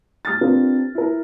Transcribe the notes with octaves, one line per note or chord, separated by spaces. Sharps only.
G3 D#6 F6 A6
C4 D4 F4 G4 A#4 B4
E4 A#4